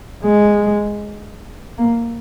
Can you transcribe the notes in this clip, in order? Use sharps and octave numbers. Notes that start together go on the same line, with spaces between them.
G#3
A#3